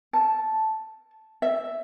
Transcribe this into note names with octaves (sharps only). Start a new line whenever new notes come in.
A5
E5